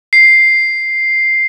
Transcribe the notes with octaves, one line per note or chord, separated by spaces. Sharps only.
C7